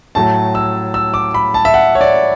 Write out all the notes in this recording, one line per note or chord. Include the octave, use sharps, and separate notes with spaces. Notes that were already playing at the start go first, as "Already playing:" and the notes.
A2 F#3 A3 A5
E6
E6
D6
B5
A5
E5
F#5
C#5
D5